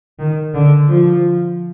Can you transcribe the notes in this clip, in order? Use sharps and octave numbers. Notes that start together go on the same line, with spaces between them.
D#3
D3
F3